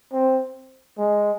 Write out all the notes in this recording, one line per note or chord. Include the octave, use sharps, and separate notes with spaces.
C4
G#3